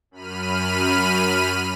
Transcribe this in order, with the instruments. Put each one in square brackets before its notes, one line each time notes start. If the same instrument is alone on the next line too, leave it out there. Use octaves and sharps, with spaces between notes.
[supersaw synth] F#2 B5 F6 D#7